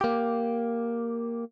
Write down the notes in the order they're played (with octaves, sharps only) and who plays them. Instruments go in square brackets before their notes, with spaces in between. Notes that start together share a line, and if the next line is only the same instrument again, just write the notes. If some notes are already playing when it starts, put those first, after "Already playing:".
[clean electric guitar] A#3 G4